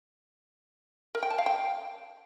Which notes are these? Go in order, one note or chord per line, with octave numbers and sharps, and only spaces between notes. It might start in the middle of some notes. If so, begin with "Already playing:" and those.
A#4
G5
A5
F5
G5